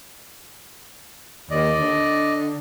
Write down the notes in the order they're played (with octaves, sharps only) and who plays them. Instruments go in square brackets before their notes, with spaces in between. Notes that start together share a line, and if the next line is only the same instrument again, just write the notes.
[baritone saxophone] D#2 [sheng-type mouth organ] D5 D#5
[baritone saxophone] D3